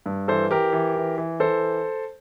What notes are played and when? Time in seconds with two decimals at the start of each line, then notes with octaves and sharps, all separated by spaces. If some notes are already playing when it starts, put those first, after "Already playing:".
0.06 G2
0.28 E3 A4 C5
0.50 E3 G4 A#4
0.73 E3
0.96 E3
1.18 E3
1.40 E3 A4 C5